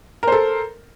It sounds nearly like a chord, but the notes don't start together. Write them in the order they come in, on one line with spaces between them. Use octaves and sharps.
A#4 C5 A4